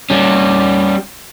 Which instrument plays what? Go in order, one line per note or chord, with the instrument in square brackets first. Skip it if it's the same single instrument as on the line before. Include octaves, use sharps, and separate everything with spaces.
[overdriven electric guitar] G3 C#4